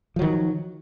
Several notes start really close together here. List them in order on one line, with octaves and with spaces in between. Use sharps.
F3 F#3 D#3